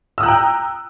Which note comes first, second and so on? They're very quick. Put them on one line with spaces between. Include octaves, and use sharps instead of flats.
E6 D#6 F#6 A#5 G5